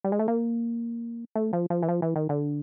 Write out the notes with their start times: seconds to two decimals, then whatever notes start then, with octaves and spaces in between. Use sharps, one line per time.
0.04 G3
0.12 G#3
0.19 A3
0.28 A#3
1.36 A3
1.53 F3
1.70 F3
1.83 E3
1.89 F3
2.02 E3
2.16 D#3
2.29 D3